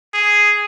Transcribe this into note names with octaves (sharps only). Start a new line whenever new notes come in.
G#4